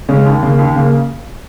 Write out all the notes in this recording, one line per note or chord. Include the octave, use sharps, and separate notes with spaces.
C#3 G#3 C#4
D#2
C#3 A#3
D#2
C#3 A#3